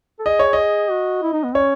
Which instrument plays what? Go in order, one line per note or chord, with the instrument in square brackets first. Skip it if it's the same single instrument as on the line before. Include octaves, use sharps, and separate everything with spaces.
[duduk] A4
[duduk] G#4 [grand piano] D#5
[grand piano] C#5
D#5
[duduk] F#4
E4
D#4
B3
[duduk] C#4 [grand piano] C#5